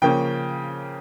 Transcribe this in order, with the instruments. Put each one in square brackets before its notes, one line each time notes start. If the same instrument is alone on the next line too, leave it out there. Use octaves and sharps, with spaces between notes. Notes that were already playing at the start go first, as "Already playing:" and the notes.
[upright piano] C#3 F3 A#3 C#4 G5